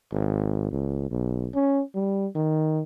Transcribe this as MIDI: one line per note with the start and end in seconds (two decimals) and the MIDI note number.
0.13 0.68 32
0.72 1.10 37
1.11 1.49 35
1.55 1.82 61
1.95 2.27 55
2.35 2.82 51